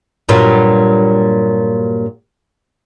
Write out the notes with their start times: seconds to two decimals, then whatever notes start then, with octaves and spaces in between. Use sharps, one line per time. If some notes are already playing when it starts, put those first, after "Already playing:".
0.29 G2 A#2 F#3